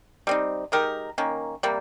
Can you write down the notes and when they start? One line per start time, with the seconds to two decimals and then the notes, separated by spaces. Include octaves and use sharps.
0.27 G3 C4 D#4
0.72 G#3 D#4 G4 A#4
1.18 D#3 A#3 C#4
1.63 C3 G3 A#3